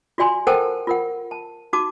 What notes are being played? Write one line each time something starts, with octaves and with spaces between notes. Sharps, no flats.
F4 F#4 D5 G#5 C6
A4 A#4 C5 F#5 G5 A5
F4 A#4 F#5
A5
D#4 F#4 A5 D6